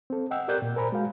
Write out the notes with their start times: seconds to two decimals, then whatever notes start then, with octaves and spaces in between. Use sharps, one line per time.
0.10 C4 A4
0.31 D#5 F#5 G5 E6
0.48 G4 A#4 D5 F#6 G6
0.62 A#2
0.76 A#4 C5 G#5 A#5 B5
0.92 G#3 F#4 F5